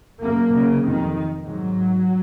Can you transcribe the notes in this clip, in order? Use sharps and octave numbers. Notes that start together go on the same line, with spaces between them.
F#2 C#3 A#3
C#3
F2 C3 D#3
G#2 F#3